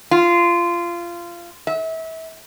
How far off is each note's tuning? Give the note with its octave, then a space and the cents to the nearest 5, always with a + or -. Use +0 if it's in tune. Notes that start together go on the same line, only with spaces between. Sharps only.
F4 -20
E5 -30